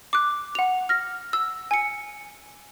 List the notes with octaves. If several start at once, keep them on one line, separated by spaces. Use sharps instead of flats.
D6 F#6
F#5 F7
F6 A#6
E6
G#5 C#7